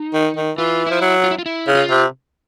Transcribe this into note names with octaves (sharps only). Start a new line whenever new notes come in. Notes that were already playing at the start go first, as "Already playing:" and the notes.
Already playing: D#4
D#3
D#3
E3 F4
F3 E4
F#3
F4
E4
F4
E4
C#3
F4
C3